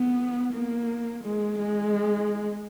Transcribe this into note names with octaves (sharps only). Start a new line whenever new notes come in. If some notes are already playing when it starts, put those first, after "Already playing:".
Already playing: B3
A#3
G#3
G#3